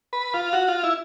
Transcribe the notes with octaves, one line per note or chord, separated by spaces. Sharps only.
B4
F4
F#4
F4
E4